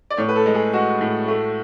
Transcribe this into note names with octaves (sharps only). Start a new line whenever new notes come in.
D5
A2 C#5
B4
A4
G#3
G#4
G#3 F#4
A2
A3